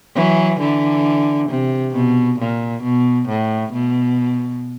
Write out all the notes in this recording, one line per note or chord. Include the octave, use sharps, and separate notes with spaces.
E3 F#3
D3 E3
C3
B2
A#2
B2
A2
B2